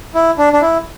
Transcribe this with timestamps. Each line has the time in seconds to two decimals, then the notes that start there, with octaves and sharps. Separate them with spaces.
0.14 E4
0.38 D4
0.53 D4
0.61 E4